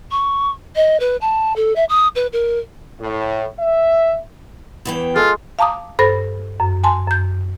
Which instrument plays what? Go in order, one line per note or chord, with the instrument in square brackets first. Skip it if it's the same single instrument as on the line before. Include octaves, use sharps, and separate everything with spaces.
[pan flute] C#6
D#5
B4
A5
A4
E5
D#6
B4
A#4
[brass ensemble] A2
E5
[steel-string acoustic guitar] E2 E3 G5
[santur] G#3 A4 [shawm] F4
[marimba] F5 A5 A#5 D6 D#6
G2 A4 C5 B5 A#6
F#2
G#5 A5 C6
F#2 G6